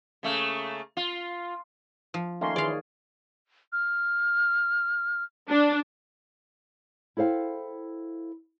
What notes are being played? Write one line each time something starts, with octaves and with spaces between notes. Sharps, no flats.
C#3 A3 A#3
F4
F3
D#3 A3 A#3 C#4 C#5 C6
D#3 E3 G#4 D5 F5
F6
D4
E4 A4 C5 F5 G5